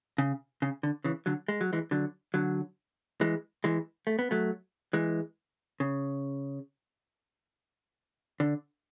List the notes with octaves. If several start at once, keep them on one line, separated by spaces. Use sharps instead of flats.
C#3
C#3
D3
C#3 E3
D3 F#3
G#3
F#3
E3 G#3
D3 F#3
D3 F#3
E3 G#3
E3 G#3
A3
B3
F#3 A3
E3 G#3
C#3
D3